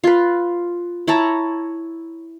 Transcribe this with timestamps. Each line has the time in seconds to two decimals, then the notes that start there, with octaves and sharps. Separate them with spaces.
0.04 F4 B4
1.07 E4 C#5 A5 A#5